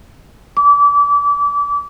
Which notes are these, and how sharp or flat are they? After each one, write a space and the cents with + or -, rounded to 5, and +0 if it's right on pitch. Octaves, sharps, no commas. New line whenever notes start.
D6 -30